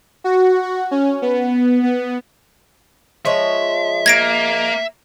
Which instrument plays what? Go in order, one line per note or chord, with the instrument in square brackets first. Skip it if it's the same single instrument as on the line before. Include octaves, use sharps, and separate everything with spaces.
[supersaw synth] F#4
F#4
C#4
B3
B3
[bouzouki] F3 G#3 C#5 [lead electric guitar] E5
[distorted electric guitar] A#3 [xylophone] G#6 A#6 D7